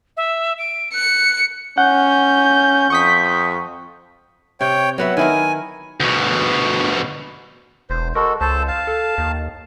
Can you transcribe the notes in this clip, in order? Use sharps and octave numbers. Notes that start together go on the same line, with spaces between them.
E5
D7
F#6 C#7
C#4 F#5 G6
F2 C#6 D#6 B6
C3 C#5 G5
F#3 B3 E5 F#5
D#3 E4 A#4 G#5
D2 B2
E1 C5
G#3 F#4 A4 A#4
C#2 A4 C5 A5
F5 A5
A4
D#2